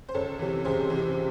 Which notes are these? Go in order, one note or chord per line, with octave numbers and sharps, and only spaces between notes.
C5
C#2 A4 C#5
C3 E3
C#2 G#4 C5
C3 E3